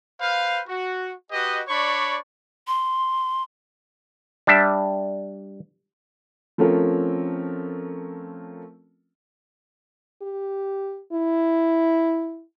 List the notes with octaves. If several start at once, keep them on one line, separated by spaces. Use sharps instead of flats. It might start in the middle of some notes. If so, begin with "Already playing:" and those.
B4 C5 F5
F#4
F#4 G4 B4 D#5
D4 C#5 D5 B5 C#6
C6
G3 D4 E5
F3 A3 C4 C#4 F4 A#4
G4
E4